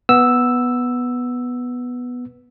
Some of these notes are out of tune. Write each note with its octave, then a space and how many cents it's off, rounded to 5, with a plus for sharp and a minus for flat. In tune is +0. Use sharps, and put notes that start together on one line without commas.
B3 +0 E6 +0